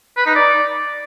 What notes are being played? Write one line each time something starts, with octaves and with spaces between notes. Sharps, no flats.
B4
D#4
D5